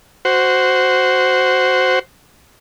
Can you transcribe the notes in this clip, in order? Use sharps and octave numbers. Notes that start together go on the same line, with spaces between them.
F#4 C5